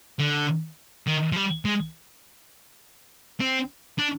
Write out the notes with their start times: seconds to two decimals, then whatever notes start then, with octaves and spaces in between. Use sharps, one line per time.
0.19 D3
1.07 D#3
1.32 F3
1.36 G3
1.65 G#3
3.40 C4
3.99 D4